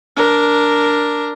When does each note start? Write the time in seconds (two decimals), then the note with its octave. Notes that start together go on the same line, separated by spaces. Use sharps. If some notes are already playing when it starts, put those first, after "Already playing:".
0.16 D4 A#4